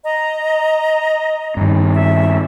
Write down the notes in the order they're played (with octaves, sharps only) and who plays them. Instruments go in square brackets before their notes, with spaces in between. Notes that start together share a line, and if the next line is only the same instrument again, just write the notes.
[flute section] D#5 A#5
[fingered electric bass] G2 D#3
[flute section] E5